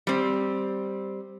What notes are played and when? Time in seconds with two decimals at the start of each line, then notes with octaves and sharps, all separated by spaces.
0.07 G3 C4